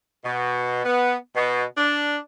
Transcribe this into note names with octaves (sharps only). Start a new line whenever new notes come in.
B2
B3
B2
D4